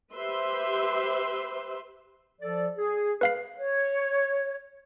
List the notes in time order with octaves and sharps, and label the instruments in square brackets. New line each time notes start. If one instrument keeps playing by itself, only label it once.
[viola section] G4 B4 C5 E5 C6
[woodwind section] F3 A4 D5
G#4
[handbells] B4 F5 C7
[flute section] C#5